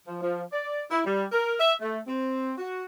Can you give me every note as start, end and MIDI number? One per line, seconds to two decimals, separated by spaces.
0.07 0.20 53
0.21 0.43 53
0.53 0.84 74
0.90 1.00 64
1.05 1.25 55
1.32 1.54 70
1.60 1.73 76
1.81 1.99 57
2.07 2.52 60
2.58 2.85 66